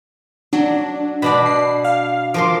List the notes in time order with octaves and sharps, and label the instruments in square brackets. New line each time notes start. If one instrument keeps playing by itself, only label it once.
[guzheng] F#3 [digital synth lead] D4
[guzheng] B2 D4 D5 [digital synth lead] B5
[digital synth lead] C7
F5
[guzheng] F3 A#4 C6 [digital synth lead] D6